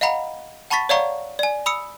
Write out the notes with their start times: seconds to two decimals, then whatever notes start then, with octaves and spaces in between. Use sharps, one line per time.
0.01 D#5 F5 F#5 A#5 B5
0.70 F#5 A5 B5 C#6 A6 B6
0.89 C#5 D5 F5 F#5 A#5 C#6
1.39 D5 G#5
1.66 B5 D#6 E6 C#7